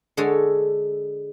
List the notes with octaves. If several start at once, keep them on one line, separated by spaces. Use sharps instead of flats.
D3 G#3 G#4 A4 C#5